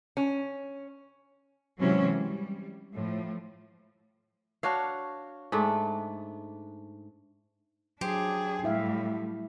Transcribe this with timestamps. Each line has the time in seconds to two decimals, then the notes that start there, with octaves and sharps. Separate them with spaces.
0.17 C#4
1.80 G#2 C3 E3 F#3 C#4
2.16 G3
2.94 A2 F3
4.63 D4 F#4 C#5 F5
5.52 G#2 A3 D4
8.01 F#3 D4 G4 G#4 C5
8.64 A2 G3 E4 E5 F5